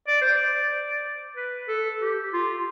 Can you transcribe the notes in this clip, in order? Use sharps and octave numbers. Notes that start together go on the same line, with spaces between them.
D5
C5
D5
B4
A4
G4
F4